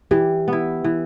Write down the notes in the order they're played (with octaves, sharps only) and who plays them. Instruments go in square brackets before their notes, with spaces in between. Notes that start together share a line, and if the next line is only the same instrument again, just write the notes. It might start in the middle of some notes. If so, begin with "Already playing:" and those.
[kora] E3 [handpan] G4
[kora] B3 E4
E3